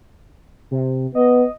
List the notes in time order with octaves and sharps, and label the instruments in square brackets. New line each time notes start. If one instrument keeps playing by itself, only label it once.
[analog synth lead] C3
[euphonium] B3 [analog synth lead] D#5